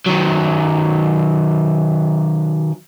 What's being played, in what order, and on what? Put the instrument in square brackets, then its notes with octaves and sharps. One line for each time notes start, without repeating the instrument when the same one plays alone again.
[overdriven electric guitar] D#3 F#3